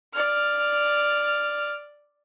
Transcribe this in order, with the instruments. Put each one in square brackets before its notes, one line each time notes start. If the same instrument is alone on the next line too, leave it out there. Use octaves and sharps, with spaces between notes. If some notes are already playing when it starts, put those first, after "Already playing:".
[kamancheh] D5 F6